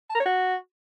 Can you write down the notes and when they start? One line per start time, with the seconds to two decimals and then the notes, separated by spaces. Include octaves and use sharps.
0.10 A5
0.15 A#4
0.20 C#5
0.25 F#4